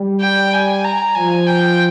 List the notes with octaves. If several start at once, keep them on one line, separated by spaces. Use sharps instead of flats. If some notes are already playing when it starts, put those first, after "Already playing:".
Already playing: G3
G5
G#5
A#5
F3 G#5
G5